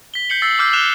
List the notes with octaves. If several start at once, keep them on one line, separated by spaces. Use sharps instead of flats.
B6 G7
G6 C7 C#7 F#7
E6 A6 C7
D6 E6 F6 G6 C7
E6 F#6 E7 F7 G7